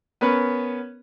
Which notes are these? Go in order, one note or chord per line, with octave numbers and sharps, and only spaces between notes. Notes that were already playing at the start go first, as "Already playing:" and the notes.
B3 C#4 A#4 B4